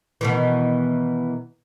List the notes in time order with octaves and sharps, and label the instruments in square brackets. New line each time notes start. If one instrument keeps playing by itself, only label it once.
[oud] B2 D#3 E3